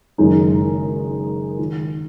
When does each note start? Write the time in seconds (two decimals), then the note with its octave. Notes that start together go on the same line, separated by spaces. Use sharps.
0.18 F#1 F#2 D#3 G#3 D#4
1.59 D#3